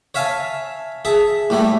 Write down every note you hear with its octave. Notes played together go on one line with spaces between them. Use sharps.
C#5 E5 F5 G#5 A5
G#4 E5 A5
A2 G3 A3 E4